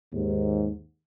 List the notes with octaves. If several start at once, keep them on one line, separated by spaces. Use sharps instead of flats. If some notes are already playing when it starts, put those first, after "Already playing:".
D#2 G#2